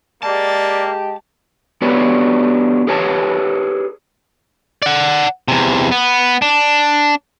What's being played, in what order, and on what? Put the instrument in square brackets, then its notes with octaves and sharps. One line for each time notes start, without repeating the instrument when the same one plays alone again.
[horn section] G#3 G4 [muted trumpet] A#3 [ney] D5 [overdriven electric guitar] A5
[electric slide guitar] B3 D4 F#4 G4 B4 C#5
G4 G#4 B4 C#5 G#5 A5
[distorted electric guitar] D5 F#5
E2 C3
B3
D4